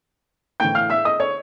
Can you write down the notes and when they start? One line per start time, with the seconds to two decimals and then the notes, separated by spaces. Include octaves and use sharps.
0.60 A2 E3 G5 G6
0.75 F5 F6
0.90 E5 E6
1.05 D#5 D#6
1.20 C#5 C#6